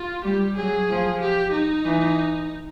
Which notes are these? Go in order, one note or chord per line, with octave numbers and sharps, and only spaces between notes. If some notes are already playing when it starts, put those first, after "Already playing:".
Already playing: F4
G3 G4
F#3 G#4
F3
G4
D#4
E3